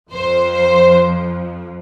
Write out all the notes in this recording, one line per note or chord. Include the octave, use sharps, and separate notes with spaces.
F2 F3 C5
C5